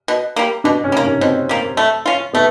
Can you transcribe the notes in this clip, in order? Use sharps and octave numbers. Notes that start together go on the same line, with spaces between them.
B2
G3 A#3
B2 D4
C#4
G3
A#3
C#4
B2 C4
G3 A#3
A3
C#4 F4
A3 B3